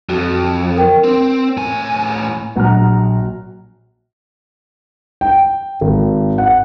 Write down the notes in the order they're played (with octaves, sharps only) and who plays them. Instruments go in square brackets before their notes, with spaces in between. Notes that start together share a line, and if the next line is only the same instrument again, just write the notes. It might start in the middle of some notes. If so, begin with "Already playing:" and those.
[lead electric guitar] F2 [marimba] F#4
[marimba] A#4 G5
[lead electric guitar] C4
A2 G#5
[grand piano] A#1 F#3 F#5 A#5 F6
G5
G#1
F#5